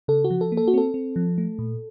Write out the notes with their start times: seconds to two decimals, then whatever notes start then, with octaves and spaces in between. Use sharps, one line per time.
0.08 C#3 A4
0.24 F#4
0.30 F3
0.41 A4
0.52 A#3
0.57 A4
0.68 F#4
0.74 C4 A4
0.94 C4
1.16 F3
1.38 A3
1.59 A#2